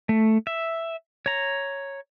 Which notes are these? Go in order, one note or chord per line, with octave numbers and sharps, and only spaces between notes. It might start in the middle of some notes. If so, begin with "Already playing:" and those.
A3
E5
C#5 A#5